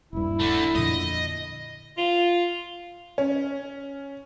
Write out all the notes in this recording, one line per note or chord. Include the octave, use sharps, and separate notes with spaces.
D#1 G2 E4
D3 A3
F2 A#2 D3 D#5
F4
C#4